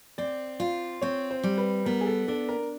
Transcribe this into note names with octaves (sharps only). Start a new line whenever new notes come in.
C4 D5
F4
C4 C#5
C5
G3
B4
B3 A#4
G#4
A4
D4 A4
A#4